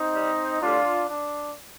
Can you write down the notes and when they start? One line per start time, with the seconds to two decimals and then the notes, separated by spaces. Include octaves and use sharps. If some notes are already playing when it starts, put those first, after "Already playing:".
Already playing: C4 D#4
0.14 C3 G3
0.61 A2 G3 D4 F4
1.08 D4